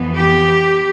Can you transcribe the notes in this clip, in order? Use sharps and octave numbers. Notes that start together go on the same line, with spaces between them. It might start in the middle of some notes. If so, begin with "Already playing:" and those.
Already playing: F2 E3 B3
G4